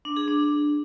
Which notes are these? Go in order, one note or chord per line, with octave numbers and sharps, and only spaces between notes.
D4
G#4
D4